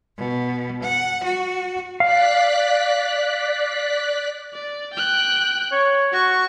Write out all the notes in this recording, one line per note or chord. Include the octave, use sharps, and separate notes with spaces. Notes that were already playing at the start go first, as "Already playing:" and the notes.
B2
F#5
F#4
D5 F5 F#6 B6
D5
G5 F#6
C#5
F#4 C#6